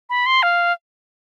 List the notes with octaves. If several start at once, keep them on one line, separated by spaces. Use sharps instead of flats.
B5
C6
F5